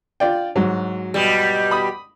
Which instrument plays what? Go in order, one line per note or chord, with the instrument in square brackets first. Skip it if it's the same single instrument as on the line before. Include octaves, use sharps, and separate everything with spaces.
[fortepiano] F4 D5 G5
G#2 F#3
[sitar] B2 G3
[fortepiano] B5 D#6